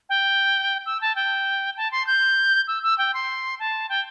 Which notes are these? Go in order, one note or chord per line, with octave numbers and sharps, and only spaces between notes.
G5
E6
A5
G5
A5
C6
G6
E6
E6
G5
C6
A5
G5